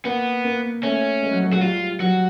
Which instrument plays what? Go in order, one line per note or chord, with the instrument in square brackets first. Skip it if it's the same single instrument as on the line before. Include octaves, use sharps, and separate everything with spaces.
[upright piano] A#3 [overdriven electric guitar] B3
[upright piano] A#3
[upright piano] A3 [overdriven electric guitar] C#4
[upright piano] G#3
F#3
F#3
[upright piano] G#3 [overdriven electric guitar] F#4
[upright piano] G3 [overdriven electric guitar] F4
[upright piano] F#3 [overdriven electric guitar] F#4